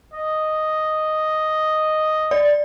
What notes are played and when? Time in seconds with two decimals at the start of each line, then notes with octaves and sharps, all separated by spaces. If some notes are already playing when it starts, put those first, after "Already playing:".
0.14 D#5
2.31 D5